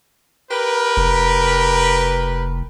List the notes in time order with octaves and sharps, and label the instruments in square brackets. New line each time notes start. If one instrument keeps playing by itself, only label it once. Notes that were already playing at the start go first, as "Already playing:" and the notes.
[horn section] G4 A#4 B4
[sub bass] F1